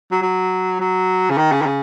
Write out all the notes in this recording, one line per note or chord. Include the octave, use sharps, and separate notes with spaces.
F#3
F#3
F#3
C#3
D#3
C#3
D#3
C#3